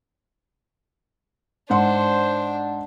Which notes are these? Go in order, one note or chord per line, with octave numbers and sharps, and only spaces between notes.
G#2 D4 C5 F#5 C6